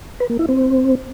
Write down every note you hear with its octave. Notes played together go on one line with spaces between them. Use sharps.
B4
A#3
E4
C4